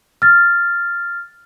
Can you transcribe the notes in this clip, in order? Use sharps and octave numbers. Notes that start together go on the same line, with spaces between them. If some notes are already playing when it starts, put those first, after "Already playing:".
F6 A6